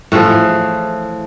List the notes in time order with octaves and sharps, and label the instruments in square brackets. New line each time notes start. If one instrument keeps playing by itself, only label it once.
[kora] A2 E3 F3 G#4